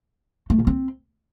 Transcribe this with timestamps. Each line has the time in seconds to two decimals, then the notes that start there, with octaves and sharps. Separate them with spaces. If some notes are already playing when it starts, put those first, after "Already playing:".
0.50 A3
0.58 A#2
0.67 C4